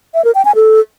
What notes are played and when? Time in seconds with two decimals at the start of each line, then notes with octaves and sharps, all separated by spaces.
0.14 E5
0.25 A#4
0.35 G5
0.45 G#5
0.55 A4